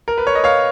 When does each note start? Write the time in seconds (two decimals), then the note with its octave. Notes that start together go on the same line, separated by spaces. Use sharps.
0.08 A#4
0.18 B4
0.27 C#5
0.35 D#5
0.44 C#5 F5